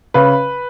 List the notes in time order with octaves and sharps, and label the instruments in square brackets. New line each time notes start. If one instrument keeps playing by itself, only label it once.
[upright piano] C#3 B4